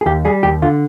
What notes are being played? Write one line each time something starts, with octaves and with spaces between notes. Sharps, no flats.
G#4
D#2 G4
G3 G#4
D#2 G4
D3 F4